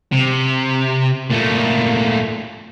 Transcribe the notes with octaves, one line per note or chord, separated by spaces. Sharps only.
C3
A#2 A3